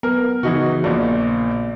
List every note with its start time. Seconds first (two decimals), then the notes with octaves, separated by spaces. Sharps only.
0.03 F#3 B3 A#4
0.43 C#3 E3 D#4 F#4
0.84 A#1 A#2 D#5